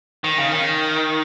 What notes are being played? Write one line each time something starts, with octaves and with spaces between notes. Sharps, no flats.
D#3
C#3
D#3